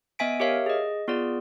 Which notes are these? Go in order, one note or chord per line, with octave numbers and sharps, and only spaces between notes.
B3 D#5 E5 G#5 B6 D7
G4 A#4 C#5 E5 F5
G#4 D#5
B3 F4 G#4 D5